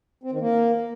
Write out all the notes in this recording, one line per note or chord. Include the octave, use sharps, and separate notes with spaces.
C4
D#3
A#3